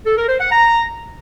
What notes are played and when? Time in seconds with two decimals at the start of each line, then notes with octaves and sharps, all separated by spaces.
0.06 A4
0.17 A#4
0.28 C5
0.40 F#5
0.51 A#5